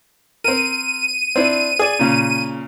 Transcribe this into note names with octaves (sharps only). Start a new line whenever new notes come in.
C4 A#4 D#7
C4 D4 E4
G#4 D5
A#2 C#3